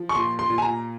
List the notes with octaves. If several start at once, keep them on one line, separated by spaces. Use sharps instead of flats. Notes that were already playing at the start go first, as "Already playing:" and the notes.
Already playing: F3
C#6
A#2 C6
C6
A#2
G#5
A#5